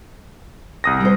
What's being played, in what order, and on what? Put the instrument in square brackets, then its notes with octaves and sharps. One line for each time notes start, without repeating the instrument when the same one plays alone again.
[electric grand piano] C2 D#6 A#6
[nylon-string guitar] G3 C5